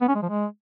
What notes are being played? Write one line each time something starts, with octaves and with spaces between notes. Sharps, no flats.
B3
C#4
G#3
F3
G#3